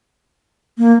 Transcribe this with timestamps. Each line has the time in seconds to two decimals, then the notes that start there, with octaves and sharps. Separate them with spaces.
0.78 A#3